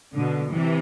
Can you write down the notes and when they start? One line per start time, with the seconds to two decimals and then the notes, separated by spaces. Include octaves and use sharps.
0.15 B2 D3
0.50 C3 E3